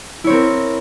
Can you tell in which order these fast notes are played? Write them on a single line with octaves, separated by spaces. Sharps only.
E4 C#5 C4 A#4